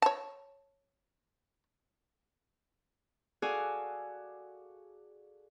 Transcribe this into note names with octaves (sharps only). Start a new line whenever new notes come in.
C#5 A5
F#4 G#4 A4 D5 F5 G#5